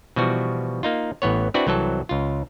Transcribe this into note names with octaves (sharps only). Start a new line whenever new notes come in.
B2 E3 F3 G3 F#4
A#3 D#4 F4
A1 E3 B3 C#5
C4 D4 E4 F#4 B4 D5
C2 E3 F#3 C4 A4
C#2 F4